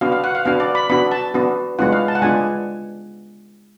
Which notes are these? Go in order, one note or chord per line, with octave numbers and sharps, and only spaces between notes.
B3 D4 F#4 F5
F5
F#5
F5
B3 D4 F#4 F5
D5
B5
B3 D4 F#4 B5
A5
B3 D4 F#4
G#3 B3 D4 F4 F#5
F5
A5
F#5
G#3 B3 D4 F4 G#5